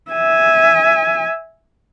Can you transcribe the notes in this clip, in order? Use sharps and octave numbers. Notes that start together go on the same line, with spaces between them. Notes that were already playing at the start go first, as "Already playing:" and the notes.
E5 G#5